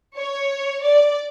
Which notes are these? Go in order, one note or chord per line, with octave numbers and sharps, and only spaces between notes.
C#5
D5